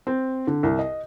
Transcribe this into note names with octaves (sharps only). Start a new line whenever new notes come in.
C4
D3
C2
D#5